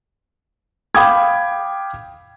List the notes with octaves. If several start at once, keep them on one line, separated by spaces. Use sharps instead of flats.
F5 G5 B5 D6 D#6 G#6